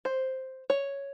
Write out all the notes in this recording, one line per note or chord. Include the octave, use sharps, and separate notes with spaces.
C5
C#5